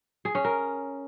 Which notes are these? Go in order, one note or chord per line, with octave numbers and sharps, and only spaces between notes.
G#4
C#4
A#4